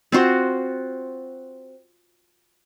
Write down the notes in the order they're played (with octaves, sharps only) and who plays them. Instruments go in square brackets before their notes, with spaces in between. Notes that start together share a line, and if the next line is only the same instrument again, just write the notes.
[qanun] C4 F4 F#4 C5